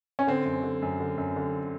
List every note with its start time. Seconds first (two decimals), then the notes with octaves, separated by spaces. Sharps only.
0.19 C#4
0.27 D3 C4
0.45 F#2
0.64 D3
0.82 F#2
1.00 D3
1.18 F#2
1.36 D3